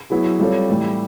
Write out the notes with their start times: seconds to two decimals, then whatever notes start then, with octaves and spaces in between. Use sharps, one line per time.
0.10 F#3 B3 E4 G#4
0.39 G3 C4 F4 A4 C#5
0.69 A2 E3 G3